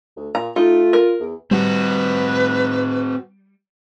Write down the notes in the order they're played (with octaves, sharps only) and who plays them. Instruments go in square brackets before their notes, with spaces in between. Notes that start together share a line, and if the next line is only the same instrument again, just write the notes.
[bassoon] D2
[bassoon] A#2 [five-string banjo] A#5
[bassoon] A3 [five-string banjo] D#4 [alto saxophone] F4
[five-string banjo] A#4
[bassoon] E2
[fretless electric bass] G3 [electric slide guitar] C4 F#4 [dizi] B4